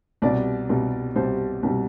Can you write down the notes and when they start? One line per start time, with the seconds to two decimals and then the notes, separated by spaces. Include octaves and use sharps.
0.22 C2 B2 G3 D5
0.69 C2 B2 G3
1.16 C2 B2 G3 C5
1.63 C2 B2 G3